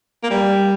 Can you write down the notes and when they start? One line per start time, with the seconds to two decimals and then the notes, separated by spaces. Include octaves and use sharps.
0.24 A#3
0.30 G3